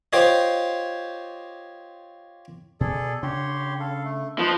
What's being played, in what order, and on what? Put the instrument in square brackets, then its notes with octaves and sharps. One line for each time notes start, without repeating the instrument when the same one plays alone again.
[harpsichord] F4 G4 C5 C#5 D#5
[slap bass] B2 [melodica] G#4 A4 D5
[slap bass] C#3 D4 [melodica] G4 C#5 C6
[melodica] A4 F5
A3
[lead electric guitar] F3 [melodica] B4 C5 D#5